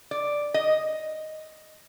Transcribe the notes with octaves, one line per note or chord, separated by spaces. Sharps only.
D5
D#5